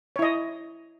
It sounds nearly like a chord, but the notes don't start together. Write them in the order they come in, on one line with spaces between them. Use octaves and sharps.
C#5 E4 D#5